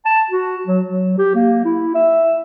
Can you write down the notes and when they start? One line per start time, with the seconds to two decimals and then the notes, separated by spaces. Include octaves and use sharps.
0.05 A5
0.30 F#4
0.67 F#3
0.87 F#3
1.18 G4
1.35 A#3
1.65 E4
1.95 E5